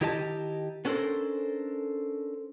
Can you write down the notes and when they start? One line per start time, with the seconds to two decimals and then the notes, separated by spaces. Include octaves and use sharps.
0.01 D#3 E4 G4 D#5 G5 A5
0.85 B3 C#4 D4 A4 A#4 C5